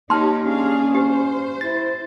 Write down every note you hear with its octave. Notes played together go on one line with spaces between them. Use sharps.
A#3 D#4 G4 C#5 A5 C6 F6
C#4 D4 G#4 F5
G4 C5
E4 A6